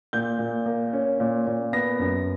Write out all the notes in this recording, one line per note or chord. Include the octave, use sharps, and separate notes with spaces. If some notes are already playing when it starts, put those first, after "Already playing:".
A#2 G6
A#2
A#3
C#4
A#2
A#2
B3 A#6
F#2